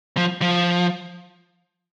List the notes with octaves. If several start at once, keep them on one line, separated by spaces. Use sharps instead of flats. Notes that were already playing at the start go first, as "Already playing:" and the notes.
F3
F3